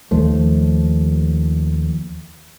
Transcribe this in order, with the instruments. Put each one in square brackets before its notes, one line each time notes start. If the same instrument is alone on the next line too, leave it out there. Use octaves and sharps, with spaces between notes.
[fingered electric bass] D#2 F3 A3